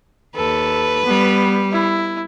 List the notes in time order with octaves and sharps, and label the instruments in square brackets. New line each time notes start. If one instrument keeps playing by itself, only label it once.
[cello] D#2 [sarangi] A4 [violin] B4
[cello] G3 [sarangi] B3
[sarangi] E4